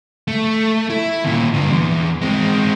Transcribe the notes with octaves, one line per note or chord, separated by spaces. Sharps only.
A3
E4
D#2 A#2
G2 D3
E2
G#3 C4